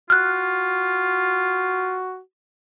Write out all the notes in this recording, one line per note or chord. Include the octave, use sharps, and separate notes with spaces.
F4 F#4 F6 F#6